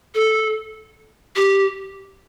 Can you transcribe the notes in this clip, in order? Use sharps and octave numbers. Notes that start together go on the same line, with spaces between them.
A4
G4